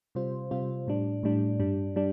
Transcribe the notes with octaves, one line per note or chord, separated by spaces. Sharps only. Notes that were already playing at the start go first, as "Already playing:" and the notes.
C3 G3 F4 C5
C3 G3 F4 C5
A2 G3 D4
A2 G3 D4
G2 G3 D4
G3 D4